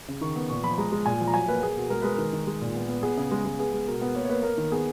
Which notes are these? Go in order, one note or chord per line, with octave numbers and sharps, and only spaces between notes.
C#3
D#3 C#6
B3
A#2 C#6
F3 B5
B5
G#3 A#5
G#3
A#2 G#5
F3
A#5
F#3 G#5
A#3 B4
A#3 G#4
B2
G#3 A#4
G#3 B4
D#3 A#4
D#3
G#3
A#2
B3
B3
B3 G#4
C#3
G#3
G#3
B3 G#4
G#3
B2 A#4
B3
A#3 C#5
C#5
A#3 B4
A#3 A#4
D#3
B3 G#4